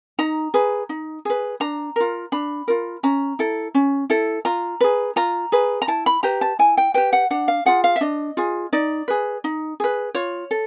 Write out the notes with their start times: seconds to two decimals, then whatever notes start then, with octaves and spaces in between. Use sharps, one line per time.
0.19 D#4 A#5
0.54 G#4 B4
0.89 D#4
1.25 G#4 B4
1.60 D4 A#5
1.96 F4 A#4
2.32 D4 B5
2.68 F4 A#4
3.03 C#4 A#5
3.39 E4 A4
3.75 C#4
4.10 E4 A4
4.45 F4 A#5
4.81 G#4 B4
5.16 F4 A#5
5.52 G#4 B4
5.82 A#5
5.88 E4 A5
6.06 B5
6.23 G4 B4 A#5
6.41 A5
6.59 E4 G#5
6.77 G5
6.94 G4 B4 G5
7.13 F#5
7.31 D4 F#5
7.48 F5
7.66 F4 G#4 F#5
7.84 F5
7.96 E5
8.01 D4 D#5
8.37 F4 G#4
8.73 D#4 D5
9.08 G#4 B4
9.44 D#4
9.80 G#4 B4
10.15 F4 C#5
10.51 A4